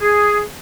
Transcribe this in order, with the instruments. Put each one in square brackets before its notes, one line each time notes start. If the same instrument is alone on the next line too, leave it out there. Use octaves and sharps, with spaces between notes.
[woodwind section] G#4